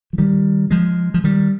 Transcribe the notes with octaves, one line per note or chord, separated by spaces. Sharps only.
F3
D#3 G3
F3 G#3
F3
D#3 G3